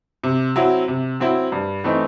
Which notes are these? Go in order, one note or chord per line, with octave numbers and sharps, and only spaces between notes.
C3
F#3 C4 E4
C3
F#3 C4 E4
G2
E3 A3 C4 D#4